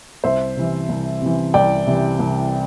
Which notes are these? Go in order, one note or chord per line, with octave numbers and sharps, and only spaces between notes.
C2 C5 E5
C3 E3
C2
C3 E3
C2 D5 G5
C3 E3
C2